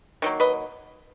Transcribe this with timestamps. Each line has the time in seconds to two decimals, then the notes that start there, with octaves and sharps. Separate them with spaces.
0.22 D#3 F#3 A#3
0.40 B4 D#5